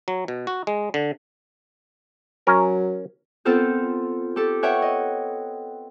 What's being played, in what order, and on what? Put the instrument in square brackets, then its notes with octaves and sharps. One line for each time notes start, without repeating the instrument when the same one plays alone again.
[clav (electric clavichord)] F#3
B2
F#4
G#3
D3
[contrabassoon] F#3 [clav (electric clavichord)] C#4 A#4
[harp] B3 C4 F4 A4 A#4 C5
G4 A4
B4 C#5 E5 F#5 G5
D#5